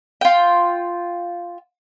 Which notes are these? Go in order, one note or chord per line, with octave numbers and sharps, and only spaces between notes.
F4 G5